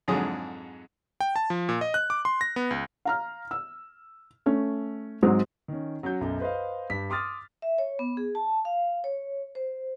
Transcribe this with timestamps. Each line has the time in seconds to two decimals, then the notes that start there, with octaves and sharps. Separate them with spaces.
0.08 F2 G#2 D3 F#3 G#4 D#6
1.20 G5
1.36 A5
1.50 F3
1.69 A#2
1.81 D#5
1.94 F#6
2.10 D6
2.25 C6
2.41 A#6
2.56 B3
2.71 C#2
3.05 F5 A#5 F6
3.51 E6
4.46 A3 C#4
5.23 G#2 F#3 G#3 C4
5.68 D#3 C#4
6.03 F#3 C#4 F#4 G6
6.21 B1 F#2
6.40 B4 C5 D#5 F5
6.90 G2 B6
7.10 C6 D6 D#6 F6 A6
7.62 E5
7.78 C#5
7.99 B3
8.17 G#4
8.35 A5
8.65 F5
9.04 C#5
9.55 C5